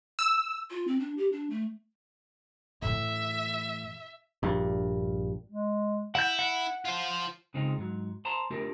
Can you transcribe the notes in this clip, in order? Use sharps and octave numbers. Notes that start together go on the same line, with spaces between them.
E6
F4
C4
D4
G4
D4
A3
A2 E3 E5
A#1 G2
G#3
E4 F#5 G6
F#5
F4 C5
C#3 G#3 C4 D#4 F4
G#2 F#3
C5 A5 A#5 C6
A3 D4 F4 G4 A#4